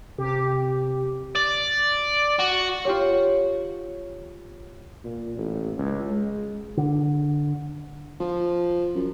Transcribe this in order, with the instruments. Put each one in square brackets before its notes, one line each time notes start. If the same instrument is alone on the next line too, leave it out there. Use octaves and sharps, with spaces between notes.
[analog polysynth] C3 G4
[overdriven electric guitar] D5
F#4
[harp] F4 G4 C#5
[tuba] A#2
A1
C#2
G#3
[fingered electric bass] D3
[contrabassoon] F3
F#2